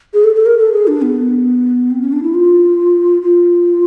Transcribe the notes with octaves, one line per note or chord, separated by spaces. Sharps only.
G#4
A4
A4
A#4
A4
G#4
D4
B3
C4
C#4
D4
E4
F4
F4